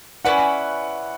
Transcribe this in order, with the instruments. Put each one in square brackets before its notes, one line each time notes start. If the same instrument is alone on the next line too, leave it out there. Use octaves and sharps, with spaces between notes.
[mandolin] C#4 E4 B4 [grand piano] D5 F#5